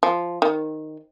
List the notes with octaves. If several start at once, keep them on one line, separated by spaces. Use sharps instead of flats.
F3
D#3